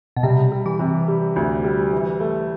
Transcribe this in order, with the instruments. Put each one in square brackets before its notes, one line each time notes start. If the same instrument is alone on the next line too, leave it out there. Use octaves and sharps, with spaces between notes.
[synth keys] B2
[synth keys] C3 [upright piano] G3
[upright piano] G3
[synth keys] E3
[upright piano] C3
G3
D2
G3
E3
A3